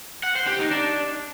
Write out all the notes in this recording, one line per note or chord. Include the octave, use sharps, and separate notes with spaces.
F#5
C5
G4
D#4
D4